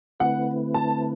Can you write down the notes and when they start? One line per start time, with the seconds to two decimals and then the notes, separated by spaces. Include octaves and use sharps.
0.20 D3 A3 C4 E4 B4 F#5
0.74 A5